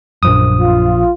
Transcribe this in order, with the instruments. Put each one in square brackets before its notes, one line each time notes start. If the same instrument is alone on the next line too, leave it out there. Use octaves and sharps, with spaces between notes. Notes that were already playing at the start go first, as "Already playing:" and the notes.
[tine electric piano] A#1 F3 D#6 [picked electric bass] F#2
[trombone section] F4